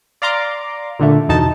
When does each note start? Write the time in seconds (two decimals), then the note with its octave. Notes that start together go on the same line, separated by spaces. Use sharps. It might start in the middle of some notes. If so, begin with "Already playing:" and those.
0.22 D5 F5 A#5 C6 D6
0.99 A#2 D3 A3
1.29 E2 B2 D#4 A5